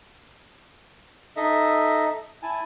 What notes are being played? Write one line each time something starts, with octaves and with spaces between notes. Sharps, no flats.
D#4 A4 D#5 E5
E4 G#5 A5